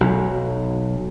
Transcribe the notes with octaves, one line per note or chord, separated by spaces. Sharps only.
B1 F#3